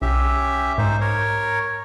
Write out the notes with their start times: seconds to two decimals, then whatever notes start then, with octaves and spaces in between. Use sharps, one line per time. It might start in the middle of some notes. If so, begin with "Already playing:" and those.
0.02 B1 C#4 G4 E5
0.78 G#2 D#4 C5
1.01 A#4 C#5